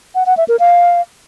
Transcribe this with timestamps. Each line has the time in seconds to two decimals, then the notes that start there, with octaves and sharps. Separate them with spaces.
0.15 F#5
0.26 F#5
0.37 E5
0.48 A#4
0.60 F5